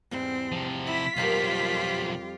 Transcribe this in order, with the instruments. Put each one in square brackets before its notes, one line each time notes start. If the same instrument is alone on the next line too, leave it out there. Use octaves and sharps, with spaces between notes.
[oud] E2 G#2 G3 [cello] C4
[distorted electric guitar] C3 F3
[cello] E4 [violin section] B6
[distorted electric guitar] B1 F3 [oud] F2 G3 A#4 [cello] F4 G4